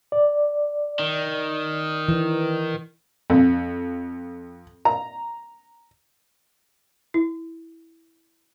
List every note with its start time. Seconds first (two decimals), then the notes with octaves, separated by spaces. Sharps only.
0.12 D5
0.99 D#3
2.08 E3
3.30 F2
4.85 A#5
7.14 E4